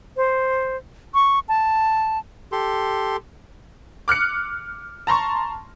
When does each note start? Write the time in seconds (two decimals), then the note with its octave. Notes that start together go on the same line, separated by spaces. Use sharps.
0.17 C5
1.14 C#6
1.49 A5
2.52 G4 A4 C6
4.08 D6 F6 F#6 C#7
5.07 A5 A#5 C6 C#6